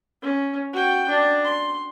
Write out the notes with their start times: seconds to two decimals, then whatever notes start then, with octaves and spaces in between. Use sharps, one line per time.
0.22 C#4
0.73 F#4 G5
1.09 D4
1.44 C6